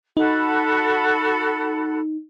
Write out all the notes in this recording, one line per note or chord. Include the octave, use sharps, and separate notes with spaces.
D#4 F#4 A4 B5